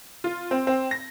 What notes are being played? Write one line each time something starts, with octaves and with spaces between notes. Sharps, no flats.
F4
C4
C4
A#6